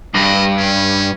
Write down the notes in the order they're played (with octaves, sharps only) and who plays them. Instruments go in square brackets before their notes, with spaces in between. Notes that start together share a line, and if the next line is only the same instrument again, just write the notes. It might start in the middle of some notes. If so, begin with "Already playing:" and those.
[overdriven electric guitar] G2 [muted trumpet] D#5
[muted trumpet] C#4